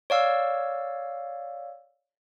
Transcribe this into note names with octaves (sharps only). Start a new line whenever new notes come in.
C#5 D5 F5 E6